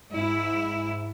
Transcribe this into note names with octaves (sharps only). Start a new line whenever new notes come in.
G#2 E4